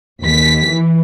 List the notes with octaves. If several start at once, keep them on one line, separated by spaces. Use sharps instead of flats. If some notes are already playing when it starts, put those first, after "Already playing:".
D#2 B6
E3